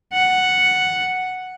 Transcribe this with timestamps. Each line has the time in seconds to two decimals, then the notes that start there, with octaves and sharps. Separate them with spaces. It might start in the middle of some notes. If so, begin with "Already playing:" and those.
0.13 F#5